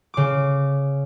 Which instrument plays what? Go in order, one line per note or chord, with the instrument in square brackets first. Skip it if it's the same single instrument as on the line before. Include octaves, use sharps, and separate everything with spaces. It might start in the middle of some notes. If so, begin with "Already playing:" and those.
[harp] C#3 D6